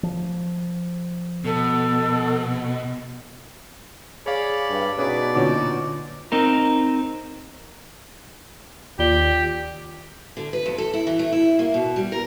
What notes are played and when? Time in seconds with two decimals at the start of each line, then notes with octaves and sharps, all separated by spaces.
0.03 F3
1.45 B2 A4
4.26 G#4 C#5 D5 F5 B5
4.69 G2
4.98 B2 C#4 D#4 G#4 B4 D5
5.35 A#2 D3 C#4 D#4 F#4 D6
6.32 C4 D#4 A#4
8.99 D#2 F4 G4 D5 G7
10.37 D3
10.53 B4
10.66 F2
10.78 A4
10.94 E4
11.07 E3
11.19 A3
11.32 E4
11.59 A#3
11.74 B2
11.96 G3
12.12 A#4